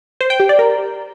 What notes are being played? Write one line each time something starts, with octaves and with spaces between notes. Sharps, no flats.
C5
G5
G4
D5
A#4